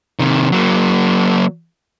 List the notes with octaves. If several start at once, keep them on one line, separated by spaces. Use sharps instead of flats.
C3 D#3
F#3 A#3